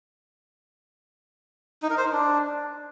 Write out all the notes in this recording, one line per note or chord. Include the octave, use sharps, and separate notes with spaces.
D#4
A#4
C5
D#4
D4